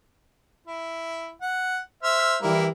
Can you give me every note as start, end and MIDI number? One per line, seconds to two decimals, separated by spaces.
0.67 1.32 64
1.42 1.78 78
2.03 2.36 72
2.03 2.36 76
2.03 2.36 89
2.42 2.69 52
2.42 2.69 55
2.42 2.66 58
2.42 2.66 64